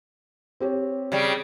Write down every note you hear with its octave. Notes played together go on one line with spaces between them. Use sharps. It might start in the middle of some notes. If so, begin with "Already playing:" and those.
C4 G4 C#5
C#3 G3